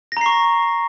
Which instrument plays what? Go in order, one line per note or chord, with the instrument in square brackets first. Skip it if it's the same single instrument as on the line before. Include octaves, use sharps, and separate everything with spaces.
[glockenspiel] A#6
A#5
C7
C#6